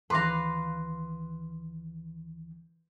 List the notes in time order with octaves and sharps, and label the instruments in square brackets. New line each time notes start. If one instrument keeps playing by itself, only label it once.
[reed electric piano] D2 D#3 E3 [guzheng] B4 F5 [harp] C6 D6 A#6